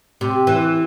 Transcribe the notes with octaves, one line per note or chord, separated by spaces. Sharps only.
C3
E3